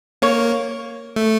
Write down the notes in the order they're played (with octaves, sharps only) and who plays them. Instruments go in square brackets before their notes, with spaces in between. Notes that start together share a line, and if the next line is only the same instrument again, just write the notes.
[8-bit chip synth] A#3 [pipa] C#5
[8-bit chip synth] A3